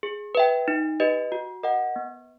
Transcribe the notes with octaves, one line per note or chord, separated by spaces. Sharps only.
G#4
B4 E5 G5
D#4
G4 B4 D#5
F#4
A#4 D#5 F#5
B3